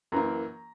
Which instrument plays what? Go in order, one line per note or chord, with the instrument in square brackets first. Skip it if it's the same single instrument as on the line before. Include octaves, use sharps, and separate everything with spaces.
[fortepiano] F#2 E3 A#3 [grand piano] A#5